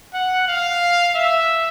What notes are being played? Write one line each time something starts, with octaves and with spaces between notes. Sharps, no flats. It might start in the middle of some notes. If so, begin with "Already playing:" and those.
F#5
F5
E5